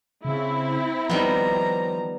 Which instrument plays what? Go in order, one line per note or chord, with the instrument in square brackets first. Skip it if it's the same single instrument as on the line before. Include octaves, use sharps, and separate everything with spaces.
[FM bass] C#3 [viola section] C4 E4
[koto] D#3 G3 B3 [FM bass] F3 [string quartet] A#5